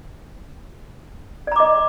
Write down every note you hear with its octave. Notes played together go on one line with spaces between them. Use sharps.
D5 D#5 A#5 D6